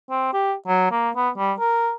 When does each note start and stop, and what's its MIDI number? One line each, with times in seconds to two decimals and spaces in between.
0.10 0.29 60
0.34 0.54 67
0.67 0.89 54
0.91 1.10 58
1.16 1.30 59
1.38 1.53 55
1.59 1.93 70